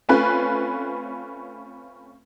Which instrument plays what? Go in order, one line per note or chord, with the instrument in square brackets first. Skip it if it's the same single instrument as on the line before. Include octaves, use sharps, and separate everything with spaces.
[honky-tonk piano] A3 C4 C#4 F4 B4 F#6